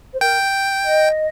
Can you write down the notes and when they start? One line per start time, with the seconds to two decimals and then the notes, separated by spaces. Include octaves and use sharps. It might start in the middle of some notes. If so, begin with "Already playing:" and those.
0.14 C5
0.20 A#4 G5
0.83 D#5